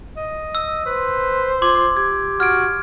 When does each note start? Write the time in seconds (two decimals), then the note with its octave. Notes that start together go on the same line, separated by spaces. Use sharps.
0.17 D#5
0.55 E6
0.86 B4 C5
1.62 F4 C6 D6 G#6
1.97 G4 G#6
2.40 F#4 F6 G#6 D7